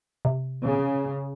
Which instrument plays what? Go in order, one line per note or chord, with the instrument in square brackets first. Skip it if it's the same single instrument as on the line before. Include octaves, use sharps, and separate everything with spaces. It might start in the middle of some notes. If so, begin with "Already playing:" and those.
[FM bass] C3
[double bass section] C#3